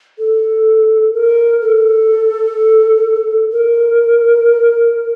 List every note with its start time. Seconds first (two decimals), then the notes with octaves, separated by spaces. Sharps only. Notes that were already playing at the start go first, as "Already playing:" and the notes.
0.19 A4
1.13 A#4
1.62 A4
3.52 A#4